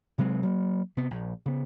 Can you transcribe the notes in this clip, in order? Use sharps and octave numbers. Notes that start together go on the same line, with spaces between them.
C3 F#3 G#3 C4
F#3 A#3
C3 B3
A#1
C#3 B3